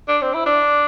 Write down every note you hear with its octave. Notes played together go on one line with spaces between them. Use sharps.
D4
C4
E4
D4